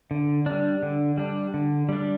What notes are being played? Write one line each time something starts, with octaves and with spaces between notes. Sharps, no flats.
D3
G3 D4
D3
G3 D4
D3
G3 D4